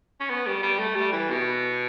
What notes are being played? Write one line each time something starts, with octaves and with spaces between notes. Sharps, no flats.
C#4
B3
G3
G3
A3
G3
E3
B2